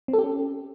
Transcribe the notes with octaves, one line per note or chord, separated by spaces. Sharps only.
C4
A4
G4
C#4